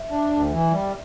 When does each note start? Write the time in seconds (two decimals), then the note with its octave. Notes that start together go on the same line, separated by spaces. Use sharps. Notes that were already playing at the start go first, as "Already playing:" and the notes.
Already playing: E5
0.10 D4
0.31 D2
0.52 E3
0.72 G3